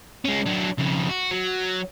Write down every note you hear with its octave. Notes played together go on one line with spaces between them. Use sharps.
G#3 C#4
F#3 D4
F2 C#3
F#4
F#3